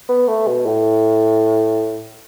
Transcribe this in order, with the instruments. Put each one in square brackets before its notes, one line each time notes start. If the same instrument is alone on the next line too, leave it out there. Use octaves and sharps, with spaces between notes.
[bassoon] B3
A3
B2
A2